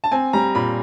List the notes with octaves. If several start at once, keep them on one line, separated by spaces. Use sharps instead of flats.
A5
C4 G#5
G3 A#5
A#2 B5